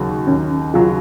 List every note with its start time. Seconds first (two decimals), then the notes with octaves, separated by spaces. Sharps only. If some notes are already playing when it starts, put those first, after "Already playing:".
Already playing: D#2 C#3 F#3
0.27 D#2 C#4
0.74 C#3 F#3 F4